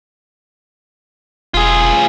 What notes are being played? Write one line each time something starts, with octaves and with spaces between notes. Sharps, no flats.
E1 F4 G#4